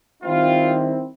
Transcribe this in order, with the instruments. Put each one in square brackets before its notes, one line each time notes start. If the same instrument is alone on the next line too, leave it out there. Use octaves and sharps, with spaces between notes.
[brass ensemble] D#3 G3 C4 E4 F4